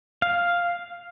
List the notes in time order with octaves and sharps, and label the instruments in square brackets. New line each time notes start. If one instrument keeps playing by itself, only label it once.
[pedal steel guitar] F5